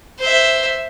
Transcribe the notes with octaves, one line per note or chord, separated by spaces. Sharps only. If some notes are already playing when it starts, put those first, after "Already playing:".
C5 E5